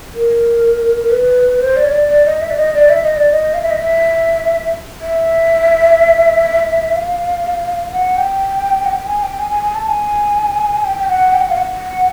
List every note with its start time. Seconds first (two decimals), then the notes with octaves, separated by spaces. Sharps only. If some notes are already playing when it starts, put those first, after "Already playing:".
0.14 A#4
1.03 A#4
1.10 B4
1.60 C5
1.76 D5
1.85 C#5
1.92 D5
2.08 D5
2.25 D#5
2.41 E5
2.50 D5
2.56 D#5
2.74 D5
2.89 E5
3.03 D#5
3.16 D5
3.31 D#5
3.54 F5
3.62 E5
3.70 D#5
3.77 E5
5.01 E5
6.96 F5
7.92 F#5
8.17 G5
8.85 F#5
8.89 G5
9.07 G#5
9.23 G5
9.39 G#5
9.51 G#5
9.63 G#5
9.75 A5
9.88 G#5
10.84 G5
10.99 G5
11.08 F#5
11.33 G5
11.41 F#5
11.50 F5
11.57 F#5